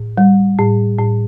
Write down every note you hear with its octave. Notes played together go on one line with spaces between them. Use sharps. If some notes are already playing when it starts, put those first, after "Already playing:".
Already playing: A2
G3
A2
A2